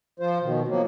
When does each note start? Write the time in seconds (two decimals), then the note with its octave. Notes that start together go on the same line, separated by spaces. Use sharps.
0.20 F3 F4 C5
0.42 B2 D#3
0.68 B2 F3 F#3 A#3